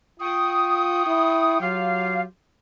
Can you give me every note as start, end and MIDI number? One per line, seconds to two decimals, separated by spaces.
0.20 1.02 65
0.20 1.61 79
0.20 1.61 85
0.20 1.61 87
1.06 1.57 64
1.61 2.25 54
1.61 2.22 65
1.61 2.22 67
1.61 2.22 77